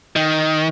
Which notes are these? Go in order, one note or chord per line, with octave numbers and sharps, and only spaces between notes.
D#3